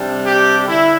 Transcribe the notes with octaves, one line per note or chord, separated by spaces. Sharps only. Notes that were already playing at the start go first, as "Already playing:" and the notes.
Already playing: C3 G3 D4
G4
D3 E4